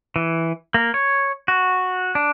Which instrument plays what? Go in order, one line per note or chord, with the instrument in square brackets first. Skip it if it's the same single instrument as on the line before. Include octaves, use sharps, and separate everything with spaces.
[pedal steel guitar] E3
A#3
C#5
F#4
D4